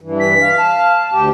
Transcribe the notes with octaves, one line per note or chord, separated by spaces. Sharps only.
G2 E3
B6
F5
A5
D2 G4